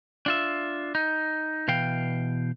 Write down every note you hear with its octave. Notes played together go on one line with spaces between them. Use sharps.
D4 F4 E5
D#4
B2 E3 F5 G5